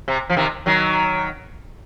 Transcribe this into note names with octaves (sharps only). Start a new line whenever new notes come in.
C3
F3
C3 D#3
D#3 F#3